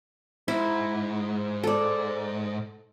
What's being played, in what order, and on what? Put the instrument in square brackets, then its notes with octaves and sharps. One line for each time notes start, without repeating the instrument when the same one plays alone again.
[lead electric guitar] G#2 [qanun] E4
[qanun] A4 D5